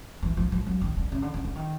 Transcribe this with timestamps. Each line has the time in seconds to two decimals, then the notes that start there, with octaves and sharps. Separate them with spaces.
0.22 E3
0.37 F3
0.52 F3
0.67 F#3
0.81 D#3
0.97 D3
1.12 C#3
1.22 D3
1.34 D3
1.44 D3
1.56 D#3